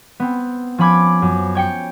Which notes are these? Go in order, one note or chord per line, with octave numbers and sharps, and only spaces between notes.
B3 C4
F3 C#4 B5 D6 G#6
F#2
C#5 G5 C#7